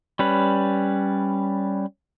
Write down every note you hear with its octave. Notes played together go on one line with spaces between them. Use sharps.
G3 C#4 B4